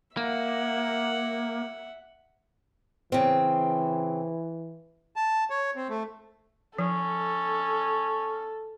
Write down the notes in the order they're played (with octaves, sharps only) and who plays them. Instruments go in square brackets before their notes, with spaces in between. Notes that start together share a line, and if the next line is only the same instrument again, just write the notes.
[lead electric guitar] A#3 [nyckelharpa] E5 F#5
[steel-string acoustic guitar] C#3 C4 [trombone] E3
[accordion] A5
C#5
C4
A3
[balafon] F3 [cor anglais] C#4 [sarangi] A4